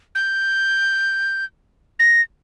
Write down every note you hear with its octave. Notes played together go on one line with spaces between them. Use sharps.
G6
A#6